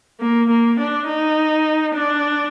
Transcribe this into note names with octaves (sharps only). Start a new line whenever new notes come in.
A#3
A#3
D4
D#4
D4